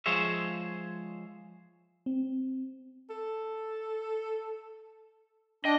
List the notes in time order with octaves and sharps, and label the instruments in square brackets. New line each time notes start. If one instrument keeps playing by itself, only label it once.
[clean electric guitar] F3 G#3 G#4 C5 C#5 E5
[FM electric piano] C4
[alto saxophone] A4
[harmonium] D4 [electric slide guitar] D#5 [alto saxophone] G5